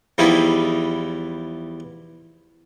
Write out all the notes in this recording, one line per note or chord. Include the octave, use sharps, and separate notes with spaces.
E2 F3 G3 D#4 E4